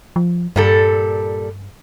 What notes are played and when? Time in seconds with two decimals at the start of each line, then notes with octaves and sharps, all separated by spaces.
0.16 F3
0.56 G2 A#2 G3 A4